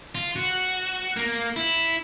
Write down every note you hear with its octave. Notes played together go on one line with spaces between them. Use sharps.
F4
F#4
A#3
E4